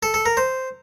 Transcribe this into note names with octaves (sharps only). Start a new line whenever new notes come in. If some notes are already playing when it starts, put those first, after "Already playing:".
A4
A4
A#4
C5